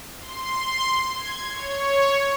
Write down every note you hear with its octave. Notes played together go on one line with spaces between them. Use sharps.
C6
G#6
C#5